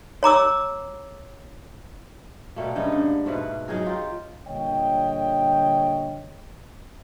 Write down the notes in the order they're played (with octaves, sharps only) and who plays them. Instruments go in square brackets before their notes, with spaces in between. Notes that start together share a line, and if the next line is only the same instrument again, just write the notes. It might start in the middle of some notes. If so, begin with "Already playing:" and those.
[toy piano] C#5 A#5 D6 E6
[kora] B2 G3 A3 A#3
G2 C#3 D#4 D#5
D3
G#2 B2 A3 B4
F#3 D#4 G#4 A#4
F4 G4
[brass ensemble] A#2 D3 G3 C#5 D#5 G5